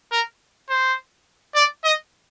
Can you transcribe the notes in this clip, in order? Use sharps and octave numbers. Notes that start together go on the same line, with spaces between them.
A#4
C5
D5
D#5